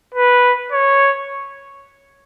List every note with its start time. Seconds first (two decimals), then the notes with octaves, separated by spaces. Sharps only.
0.15 B4
0.72 C#5